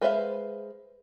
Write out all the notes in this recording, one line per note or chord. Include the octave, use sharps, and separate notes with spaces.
G#3 B4 C5 E5 F5